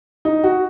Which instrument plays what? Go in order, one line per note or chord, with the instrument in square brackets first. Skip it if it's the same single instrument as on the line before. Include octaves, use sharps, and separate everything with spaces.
[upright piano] D#4
F#4